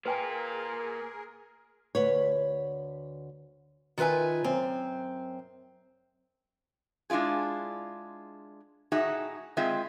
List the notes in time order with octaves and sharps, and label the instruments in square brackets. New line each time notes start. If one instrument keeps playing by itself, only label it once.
[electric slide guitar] A#3 F4 [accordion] G#4 A#4 [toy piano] B4 G5 G#5
[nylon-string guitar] D2 B4 C#5
[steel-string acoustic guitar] D#3 F4 B4 E5 G#5
F#2 C4
[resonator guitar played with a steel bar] G#3 D4 E4 F4 G#4
A2 D#4 F#4 G#4 E5 F#5
G#3 C4 F4 G#4 D#5 E5